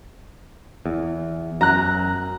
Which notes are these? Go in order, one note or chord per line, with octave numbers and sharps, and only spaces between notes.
E2
F#2 A#5 F#6